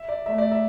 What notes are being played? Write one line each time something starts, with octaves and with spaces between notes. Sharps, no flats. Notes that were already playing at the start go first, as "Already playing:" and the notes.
Already playing: E5
D5
A3 E5
D5
E5